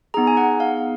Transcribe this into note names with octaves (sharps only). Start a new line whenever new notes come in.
B3 D#4 G#4 A#5
G#5
F#5
F5